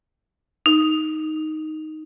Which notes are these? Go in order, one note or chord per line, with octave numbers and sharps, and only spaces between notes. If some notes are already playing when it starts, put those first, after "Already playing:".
D#4